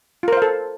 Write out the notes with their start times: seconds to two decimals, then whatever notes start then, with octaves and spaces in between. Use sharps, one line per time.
0.23 F4
0.28 A#4
0.33 C5
0.37 F5
0.42 A4